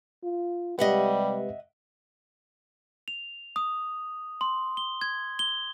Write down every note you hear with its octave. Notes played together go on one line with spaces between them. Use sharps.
F4
C3 G3 G#3 G4 B4 D#5 E5 F#5
F7
D#6
C6
G7
G#6
G7